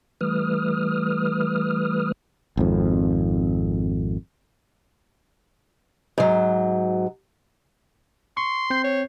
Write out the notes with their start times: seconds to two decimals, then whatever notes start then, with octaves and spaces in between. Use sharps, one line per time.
0.21 E3 G3 A3 B4 D#6 F6
2.57 G#1 F2
6.18 G#2 F#3
8.37 C6 C#6
8.70 C4 G6 C7
8.84 C#5